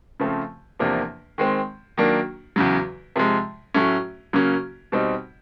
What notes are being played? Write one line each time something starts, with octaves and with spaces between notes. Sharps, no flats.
C#3 F3 A3 C4
E2 C3 F3 A#3 D4
D#3 G#3 C4
D#3 F#3 A#3 D4
E2 C#3 F#3
C3 F3 G#3
A2 F#3 A3 C#4
C#3 F#3 A#3 C#4
B2 G3 C4 D#4